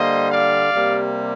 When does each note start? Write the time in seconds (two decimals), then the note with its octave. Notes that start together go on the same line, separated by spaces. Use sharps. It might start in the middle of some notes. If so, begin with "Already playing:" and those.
Already playing: D3 G3 A#3 C5 D#5
0.32 D5 F5
0.72 C3 G3 A#3